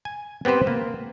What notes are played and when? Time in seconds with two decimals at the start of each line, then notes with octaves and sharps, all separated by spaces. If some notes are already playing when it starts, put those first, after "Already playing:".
0.05 G#5
0.45 B3 C4 G4 B4 C5
0.67 A#3